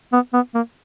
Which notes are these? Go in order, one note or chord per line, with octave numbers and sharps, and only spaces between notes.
B3
B3
A#3